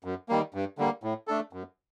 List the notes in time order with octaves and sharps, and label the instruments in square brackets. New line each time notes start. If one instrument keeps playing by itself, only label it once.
[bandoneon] F#2
D#3 G3 A#3
G2
D3 G3 A#3
A2
A3 D4 A4
F#2